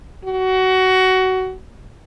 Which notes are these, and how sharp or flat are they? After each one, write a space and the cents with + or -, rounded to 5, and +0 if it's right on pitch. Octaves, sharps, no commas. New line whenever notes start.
F#4 +20